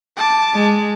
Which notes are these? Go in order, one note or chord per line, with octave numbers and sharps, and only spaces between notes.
A5 D6
G#3